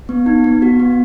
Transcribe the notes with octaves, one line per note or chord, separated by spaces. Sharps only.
B3
D#4
B3
F#4
B3